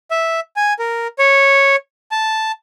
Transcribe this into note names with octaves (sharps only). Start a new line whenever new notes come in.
E5
G#5
A#4
C#5
A5